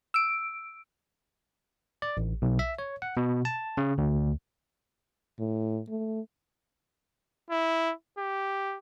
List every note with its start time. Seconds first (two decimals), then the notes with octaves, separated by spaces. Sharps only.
0.14 E6 D7
2.02 D5
2.17 A1
2.42 B1
2.59 E5
2.79 C#5
3.02 F#5
3.17 B2
3.45 A5
3.77 C#3
3.98 D2
5.39 A2
5.89 A3
7.50 E4
8.18 G4